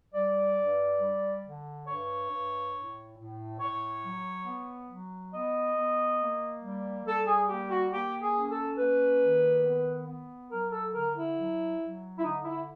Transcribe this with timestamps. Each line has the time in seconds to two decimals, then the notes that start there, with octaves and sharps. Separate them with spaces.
0.13 G3 D5
0.57 G2
0.99 G3
1.43 D3
1.86 G2 C#5
2.30 G2
2.72 A2
3.15 A2
3.59 A2 C#5
4.02 F#3
4.45 B3
4.89 F#3
5.32 B3 D#5
5.76 B3
6.18 A#3
6.61 G3
7.04 G3 A4
7.26 G#4
7.48 A#3 G4
7.69 F#4
7.91 A#3 G4
8.20 G#4
8.34 C#4
8.49 A4
8.77 A#3 B4
9.21 D#3
9.63 B3
10.07 B3
10.50 F#3 A#4
10.72 A4
10.93 D3 A#4
11.15 E4
11.37 F#3
11.80 F#3
12.19 E4
12.23 D3 D#4
12.45 E4